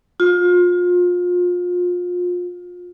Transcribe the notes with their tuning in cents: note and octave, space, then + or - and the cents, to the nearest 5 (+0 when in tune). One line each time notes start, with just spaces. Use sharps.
F4 +30